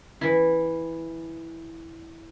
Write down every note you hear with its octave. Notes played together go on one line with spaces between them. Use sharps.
E3 E4